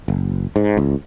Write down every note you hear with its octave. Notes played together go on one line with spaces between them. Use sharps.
F#1
G#2
C#2